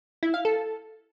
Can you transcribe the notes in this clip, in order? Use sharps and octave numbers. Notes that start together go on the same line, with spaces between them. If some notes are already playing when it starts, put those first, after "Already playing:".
E4
F5
A4